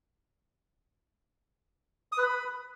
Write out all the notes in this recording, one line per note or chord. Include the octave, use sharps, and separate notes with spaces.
D#6
B4
B5